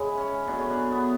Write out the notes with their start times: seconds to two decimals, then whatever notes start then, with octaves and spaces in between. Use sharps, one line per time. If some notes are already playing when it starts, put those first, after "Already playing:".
Already playing: C#3 G#3 E4
0.17 C#4
0.47 B2 F#3 A3 D4
0.59 C#4
0.70 D4
0.92 B3